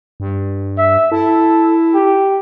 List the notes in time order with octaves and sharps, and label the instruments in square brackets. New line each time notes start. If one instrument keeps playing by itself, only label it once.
[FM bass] G2
[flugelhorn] E5
[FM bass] E4 [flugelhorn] A4
[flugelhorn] G4